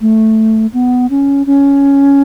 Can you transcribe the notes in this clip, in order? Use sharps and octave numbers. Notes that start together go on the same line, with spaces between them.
A3
B3
C#4
C#4